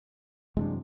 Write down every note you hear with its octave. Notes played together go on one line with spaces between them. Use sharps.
F#2 C3 E3 G#3 A#3 D4